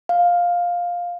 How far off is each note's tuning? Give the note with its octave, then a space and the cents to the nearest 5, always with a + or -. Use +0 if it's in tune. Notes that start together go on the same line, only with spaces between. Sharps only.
F5 +10